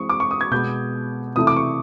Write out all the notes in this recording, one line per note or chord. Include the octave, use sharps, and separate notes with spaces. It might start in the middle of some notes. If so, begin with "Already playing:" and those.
Already playing: E3 G#3 C4 E4 C#6 D#6
D6
C#6
D#6
G#6
B2 G#3 B3 G6
C3 E3 A3 D#6
D6
C#6